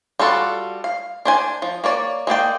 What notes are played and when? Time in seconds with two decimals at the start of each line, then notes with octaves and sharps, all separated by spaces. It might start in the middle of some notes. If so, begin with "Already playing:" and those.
0.19 G3 F4 F#4 A4
0.84 F5
1.25 D4 C5 G#5
1.62 F3
1.84 A#3 C#5 D5
2.27 G#3 A#3 D5 G5